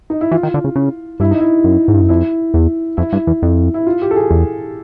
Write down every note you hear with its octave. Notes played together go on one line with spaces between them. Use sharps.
D#4
E4
E3 F4
D#3
D3
C#3
C#3
G2 E4
D#4
E4
F#2
G#2
G2
F#2
F2 E4
E2
F2 E4
G2
E2
F2
E4
F4
G4
A4
G#4
E2